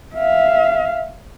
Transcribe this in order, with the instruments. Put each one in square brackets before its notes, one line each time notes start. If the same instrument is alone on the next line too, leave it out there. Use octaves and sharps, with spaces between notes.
[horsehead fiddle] E5 F5